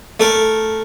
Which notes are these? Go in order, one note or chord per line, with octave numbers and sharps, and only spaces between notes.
A3 A#4